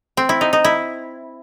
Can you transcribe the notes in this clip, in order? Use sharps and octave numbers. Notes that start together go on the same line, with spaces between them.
C4
E4
D#4
D#4
E4